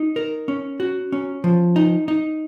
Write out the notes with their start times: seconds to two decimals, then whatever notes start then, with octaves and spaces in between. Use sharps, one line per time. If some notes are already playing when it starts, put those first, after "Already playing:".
Already playing: D#4
0.16 A#4
0.48 C#4
0.80 F#4
1.12 C#4
1.44 F3
1.76 D#4
2.08 D#4